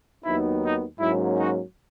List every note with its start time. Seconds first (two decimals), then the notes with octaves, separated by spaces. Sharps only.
0.24 D#2 D#3 F#3 B3 D#4 E4
0.63 D#4
1.00 G#2 F#3 A#3 C#4 E4
1.38 D#4 F#4